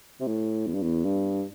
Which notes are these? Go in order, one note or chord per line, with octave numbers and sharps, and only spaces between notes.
C3
A2
E2
G2
E2
G2